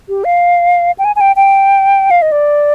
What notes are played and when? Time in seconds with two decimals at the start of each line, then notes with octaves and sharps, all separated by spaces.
0.09 G4
0.24 F5
0.98 G5
1.05 G#5
1.16 G#5
1.21 G5
1.36 G5
2.11 F5
2.22 D#5
2.32 D5